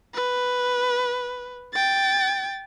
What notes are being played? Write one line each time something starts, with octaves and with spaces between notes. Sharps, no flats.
B4
G5 A6